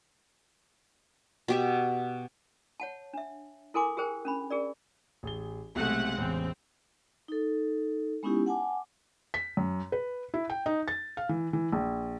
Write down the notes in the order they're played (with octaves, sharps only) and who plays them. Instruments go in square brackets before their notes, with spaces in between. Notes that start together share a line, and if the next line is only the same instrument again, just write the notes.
[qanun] B2 G4 E5
[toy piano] C#5 F#5 A5
D4 E5
E4 A4 A#4 G#5 C6 D6
G4 G#4 A#4 C5 G5
C#4 D4 B5
G#4 A#4 D5
[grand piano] A1 G#4 G7
[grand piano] B1 C3 F#6 [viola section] G#3 A3 F#5
[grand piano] A1 E2 C#3 [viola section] C4
[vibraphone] D#4 A4
G#3 B3 C#4 D#4 E4 G4
F#5 G#5 A5 D6
[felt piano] B6
F#2
B4
E4
G5
D#4
A6
F5
E3
E3
A#1